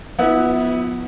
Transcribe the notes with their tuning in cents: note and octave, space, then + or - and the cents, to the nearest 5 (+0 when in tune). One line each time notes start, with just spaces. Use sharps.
F3 +25 B3 +0 E4 -30